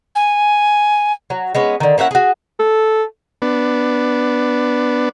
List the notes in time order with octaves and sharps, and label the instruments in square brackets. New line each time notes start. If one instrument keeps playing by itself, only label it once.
[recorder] G#5
[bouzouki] F#3
G#3 B3 C#4
D3 D#3
A#3 C#4 E4 F#5
F#4 G#4
[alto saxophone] A4
[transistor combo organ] B3 D4